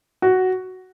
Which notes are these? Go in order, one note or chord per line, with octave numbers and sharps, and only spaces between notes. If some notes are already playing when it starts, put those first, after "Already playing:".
F#4